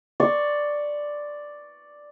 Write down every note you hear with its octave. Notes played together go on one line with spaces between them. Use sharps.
D5 C6 C#6